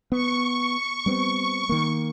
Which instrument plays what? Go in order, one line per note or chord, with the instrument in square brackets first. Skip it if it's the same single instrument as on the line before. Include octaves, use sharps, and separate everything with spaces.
[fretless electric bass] B3 [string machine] C#6
[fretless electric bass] G3 B3 C4
D#3 A#3